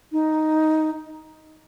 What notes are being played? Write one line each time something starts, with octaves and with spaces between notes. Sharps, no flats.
D#4